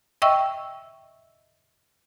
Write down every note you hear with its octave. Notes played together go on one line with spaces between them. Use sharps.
D#5 E5 G5 C#6 E6